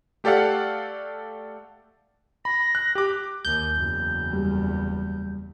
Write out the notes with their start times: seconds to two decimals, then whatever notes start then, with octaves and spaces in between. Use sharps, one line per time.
0.24 A3 G4 A4 D5 F5 F#5
2.45 B5 A#6
2.75 F#6
2.95 G4 D6
3.45 D#2 G6
3.76 F#1 E2
4.33 G3